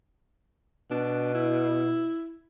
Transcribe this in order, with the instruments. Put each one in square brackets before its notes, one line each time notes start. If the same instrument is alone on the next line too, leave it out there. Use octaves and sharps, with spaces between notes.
[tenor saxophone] B2 [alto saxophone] D4
[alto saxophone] E4